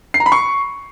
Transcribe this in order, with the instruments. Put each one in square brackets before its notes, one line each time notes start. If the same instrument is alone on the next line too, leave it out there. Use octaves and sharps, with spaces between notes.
[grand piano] C7
A#5
B5
C#6